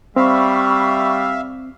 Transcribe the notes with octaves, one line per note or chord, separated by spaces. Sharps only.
G3 C4 E5 F5 B5 C#6